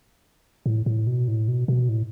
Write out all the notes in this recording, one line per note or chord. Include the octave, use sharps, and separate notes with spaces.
A2
A2
B2
A2
B2
B2
A2